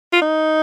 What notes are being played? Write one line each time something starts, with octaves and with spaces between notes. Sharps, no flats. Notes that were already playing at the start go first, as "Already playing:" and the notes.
F4
D#4